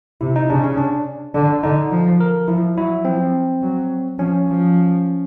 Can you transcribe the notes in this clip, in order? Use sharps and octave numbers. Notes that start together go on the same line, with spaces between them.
C3 E4
D#4
C#3 D4
C#4
D4
D3 D4
D3 D#4
F3
A#4
F3 E4
F#3 E4
F3 C4
F#3
F3 C#4
F3